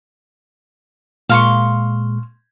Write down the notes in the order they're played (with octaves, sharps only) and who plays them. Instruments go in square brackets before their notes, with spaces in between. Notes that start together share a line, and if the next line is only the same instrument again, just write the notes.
[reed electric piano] A#2 G#3 [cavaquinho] F5 C6 C#6